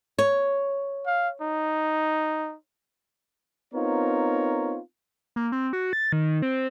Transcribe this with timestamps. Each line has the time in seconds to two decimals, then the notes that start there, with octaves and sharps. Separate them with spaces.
0.19 C#5
1.06 F5
1.42 D#4
3.74 B3 C4 D#4 F4 A#4 C#5
5.36 A#3
5.52 C4
5.73 F#4
5.93 A6
6.12 D#3
6.42 C4